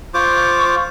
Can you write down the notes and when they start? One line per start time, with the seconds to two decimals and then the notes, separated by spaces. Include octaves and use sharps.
0.14 F4 C5 C#6 D6